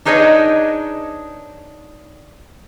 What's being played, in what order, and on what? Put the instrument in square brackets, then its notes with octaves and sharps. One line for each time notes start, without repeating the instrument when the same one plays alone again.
[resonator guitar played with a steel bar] D4 D#4 G#4 B4 C#5 D#5